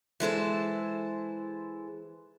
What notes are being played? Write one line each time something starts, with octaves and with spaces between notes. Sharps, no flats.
E3 G#3 A4 C5